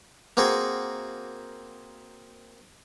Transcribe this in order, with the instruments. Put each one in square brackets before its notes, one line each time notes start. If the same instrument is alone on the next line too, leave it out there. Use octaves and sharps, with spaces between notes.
[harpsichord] A#3 C4 F#4 G#4